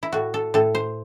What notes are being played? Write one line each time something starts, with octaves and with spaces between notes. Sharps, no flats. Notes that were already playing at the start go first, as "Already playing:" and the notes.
E4
A2 F#4
A4
A2 A4
C5